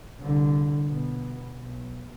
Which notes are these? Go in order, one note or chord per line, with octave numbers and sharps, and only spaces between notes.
C2 D3
B2
B1